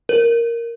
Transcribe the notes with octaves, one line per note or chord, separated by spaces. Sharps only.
A#4